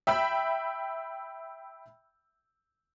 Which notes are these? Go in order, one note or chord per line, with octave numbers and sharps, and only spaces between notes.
E5 G5 B5 E6